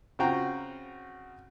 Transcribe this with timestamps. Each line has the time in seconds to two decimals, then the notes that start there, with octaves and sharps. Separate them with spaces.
0.19 C#3 C4 F4 F#4 G5 A#5